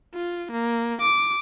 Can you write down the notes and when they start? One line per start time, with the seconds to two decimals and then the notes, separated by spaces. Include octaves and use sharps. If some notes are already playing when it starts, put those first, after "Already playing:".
0.14 F4
0.52 A#3
1.02 D6